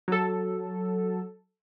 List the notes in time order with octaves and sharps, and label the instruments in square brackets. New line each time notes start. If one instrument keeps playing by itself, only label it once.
[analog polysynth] F#3 A4